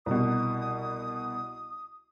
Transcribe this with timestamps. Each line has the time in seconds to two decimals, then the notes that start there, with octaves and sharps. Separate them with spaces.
0.06 C2 B2 D#6